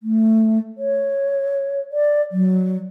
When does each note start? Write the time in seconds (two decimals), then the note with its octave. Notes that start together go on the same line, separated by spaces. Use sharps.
0.03 A3
0.78 C#5
1.92 D5
2.32 F#3